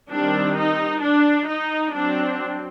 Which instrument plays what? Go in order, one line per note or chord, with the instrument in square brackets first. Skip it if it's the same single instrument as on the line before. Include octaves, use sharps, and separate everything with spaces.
[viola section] D#3 G3 C4 D4
D#4
D4
D#4
F#3 C4 D4